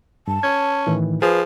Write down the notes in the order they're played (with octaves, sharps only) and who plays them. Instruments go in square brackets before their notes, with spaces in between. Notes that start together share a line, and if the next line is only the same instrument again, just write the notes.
[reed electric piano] G2 [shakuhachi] A5
[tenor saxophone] C#4 [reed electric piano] G#6
[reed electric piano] A2 D#3 E3
[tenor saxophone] F3 [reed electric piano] G#4 [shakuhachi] B4